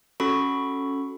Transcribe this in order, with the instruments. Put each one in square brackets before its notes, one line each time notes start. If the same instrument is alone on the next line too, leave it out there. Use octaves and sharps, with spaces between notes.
[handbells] C#4 F#4 A4 B5 C#6